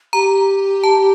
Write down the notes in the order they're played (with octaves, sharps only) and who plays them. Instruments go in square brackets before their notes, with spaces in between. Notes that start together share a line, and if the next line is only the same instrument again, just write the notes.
[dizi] G4 [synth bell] A#5
[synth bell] A5